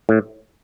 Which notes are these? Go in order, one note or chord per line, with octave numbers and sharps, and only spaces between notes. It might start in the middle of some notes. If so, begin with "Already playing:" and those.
A2